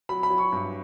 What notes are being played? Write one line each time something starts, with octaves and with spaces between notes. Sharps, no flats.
F#3 B5
B5
F#3
C#6
G2